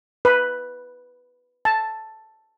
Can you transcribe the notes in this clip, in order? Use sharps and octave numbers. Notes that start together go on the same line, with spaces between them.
B4
A5